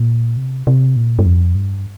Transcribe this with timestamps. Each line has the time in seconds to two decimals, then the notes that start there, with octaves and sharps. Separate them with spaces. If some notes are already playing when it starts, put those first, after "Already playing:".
Already playing: A#2
0.37 C3
0.67 C3
0.96 A#2
1.19 G2
1.26 F2
1.55 G2